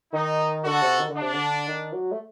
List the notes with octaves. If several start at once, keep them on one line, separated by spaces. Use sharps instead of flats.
D#3 D#4
D3 F#4 A4
C3
D#3
D3
D4
C3
D3
D#3
F#3
A3